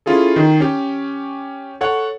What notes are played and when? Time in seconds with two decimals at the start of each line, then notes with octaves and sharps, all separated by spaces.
0.06 C#4 E4 F4 G#4 A4
0.36 D#3
0.60 C#4 G4
1.81 A4 C#5 F#5